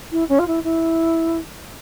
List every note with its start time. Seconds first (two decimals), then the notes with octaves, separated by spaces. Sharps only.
0.12 E4
0.29 C#4
0.39 F4
0.47 E4
0.64 E4